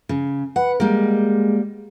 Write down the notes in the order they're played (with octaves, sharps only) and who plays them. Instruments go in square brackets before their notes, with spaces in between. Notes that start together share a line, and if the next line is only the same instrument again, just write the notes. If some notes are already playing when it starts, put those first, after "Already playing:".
[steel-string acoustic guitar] C#3
[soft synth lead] B4 [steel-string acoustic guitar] F#5
[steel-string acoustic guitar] G3 A#3 [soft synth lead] G#3